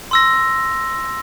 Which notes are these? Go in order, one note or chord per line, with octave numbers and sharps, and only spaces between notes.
C6 E6 A#6